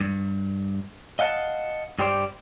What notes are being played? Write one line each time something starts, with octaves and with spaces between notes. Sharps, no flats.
G2
D#5 F5 F#5 G#5 A5
G2 G3 G4 C5 D5